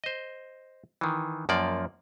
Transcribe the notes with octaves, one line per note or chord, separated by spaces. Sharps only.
C5 D#5
D#3 E3
F#2 F3 A#3 D5